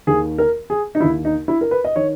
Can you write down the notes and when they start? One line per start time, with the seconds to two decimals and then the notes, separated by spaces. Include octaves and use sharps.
0.07 D#2 D#3 G#4
0.38 A#4
0.70 G#4
0.95 D#4
1.00 D#2 D#3 E4
1.25 D#4
1.48 E4
1.61 A#4
1.71 B4
1.84 D#5
1.96 D#3 C#5